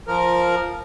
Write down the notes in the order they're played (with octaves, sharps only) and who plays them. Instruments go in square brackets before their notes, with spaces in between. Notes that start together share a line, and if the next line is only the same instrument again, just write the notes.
[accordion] F3 A#4